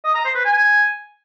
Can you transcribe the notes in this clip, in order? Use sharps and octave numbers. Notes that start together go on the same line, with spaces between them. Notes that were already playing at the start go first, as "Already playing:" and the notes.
D#5
A#5
C5
B4
G#5